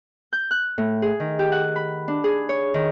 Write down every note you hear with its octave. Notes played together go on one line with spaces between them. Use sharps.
G6
F#6
A2
G#4
D#3
G4
F#5
B5
D4
G#4
C#5
D#3